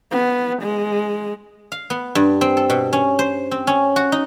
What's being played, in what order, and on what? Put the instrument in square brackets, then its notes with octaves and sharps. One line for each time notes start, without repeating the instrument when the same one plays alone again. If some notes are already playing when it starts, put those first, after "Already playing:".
[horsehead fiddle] B3
G#3
[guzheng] F5
B3
G2
C4
A4
B2
C#4
C5
C4
C#4
F#4
D#4